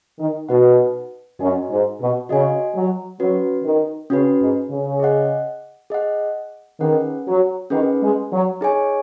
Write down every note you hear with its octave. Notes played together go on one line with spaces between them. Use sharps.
D#3
B2 D#4 B4 F#5
F#2 F#4 D#5 G#5
G#2
B2
C#3 F#4 D#5 G#5
F#3
F#3 C#4 F#4 B4
D#3
C#3 C#4 F#4 B4
G#2
C#3
G#4 D#5 F#5
G#4 D#5 F#5
D#3 C#4 G#4 B4 F#5
F#3
D#3 C#4 G#4 B4 F#5
G#3
F#3
D#4 G#4 C#5 G#5